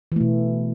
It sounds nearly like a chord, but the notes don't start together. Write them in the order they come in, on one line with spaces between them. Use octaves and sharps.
E3 A3 B2